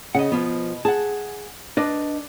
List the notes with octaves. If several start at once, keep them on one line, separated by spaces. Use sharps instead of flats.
C#3 D#5 F#5
B2 F3 B3
G#4 F#5 A5
D4 B4 D5 D#5